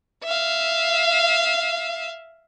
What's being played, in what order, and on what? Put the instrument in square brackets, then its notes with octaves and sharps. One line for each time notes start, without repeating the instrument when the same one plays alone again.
[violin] E5 F5